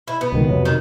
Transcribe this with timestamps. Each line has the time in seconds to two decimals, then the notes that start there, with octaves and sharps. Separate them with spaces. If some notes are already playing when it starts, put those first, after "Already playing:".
0.07 E4
0.21 B3
0.32 C#2 B2 D#3
0.48 F2 C3 F#3
0.65 D#3